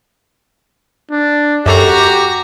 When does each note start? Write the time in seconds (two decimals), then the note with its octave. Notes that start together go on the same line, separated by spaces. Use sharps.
1.11 D4
1.66 F#2 F#4 G4 A4 A#5 D6 C7